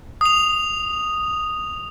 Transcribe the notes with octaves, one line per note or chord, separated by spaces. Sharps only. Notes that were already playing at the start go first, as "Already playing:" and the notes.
D#6 F7